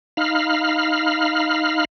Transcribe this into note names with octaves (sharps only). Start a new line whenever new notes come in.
D#4 F5 B5 F6